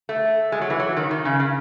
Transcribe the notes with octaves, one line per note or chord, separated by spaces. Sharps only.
A3
G#3
F#3
E3
F#3
D#3
D#3
C#3
C#3